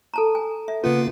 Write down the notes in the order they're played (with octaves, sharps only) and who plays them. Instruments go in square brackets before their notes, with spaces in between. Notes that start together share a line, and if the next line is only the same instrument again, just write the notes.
[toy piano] A4 A5 A#5
G#5
E5
[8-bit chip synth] C#3 A#3 F4 [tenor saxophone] B3 [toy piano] C#4